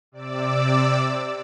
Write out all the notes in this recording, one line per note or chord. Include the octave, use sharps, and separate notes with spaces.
C3 D5 D6 E6